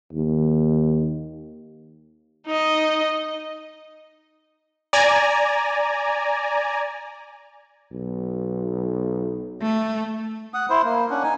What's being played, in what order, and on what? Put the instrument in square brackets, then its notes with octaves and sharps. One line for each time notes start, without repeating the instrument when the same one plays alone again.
[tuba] D#2
[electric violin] D#4 D#5
[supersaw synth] D5 G#5 A#5
[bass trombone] B1
[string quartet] A3
[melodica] F#5 D#6
E4 C5
A#3
C#4 D4 F#5
D#4 G#5